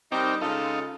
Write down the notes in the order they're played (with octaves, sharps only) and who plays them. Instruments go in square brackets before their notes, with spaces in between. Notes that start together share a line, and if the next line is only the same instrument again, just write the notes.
[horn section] G3 D#4 A#4 [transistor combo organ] C4 G5 D6
[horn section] C#3 G#3 A4 [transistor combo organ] D#4 F4